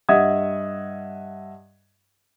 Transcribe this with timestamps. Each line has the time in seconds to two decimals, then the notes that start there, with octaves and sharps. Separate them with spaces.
0.09 G2 D#5 E5 F#5 D#6 G#6